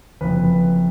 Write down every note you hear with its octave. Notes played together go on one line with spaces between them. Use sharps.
F#1 F2 F3 B4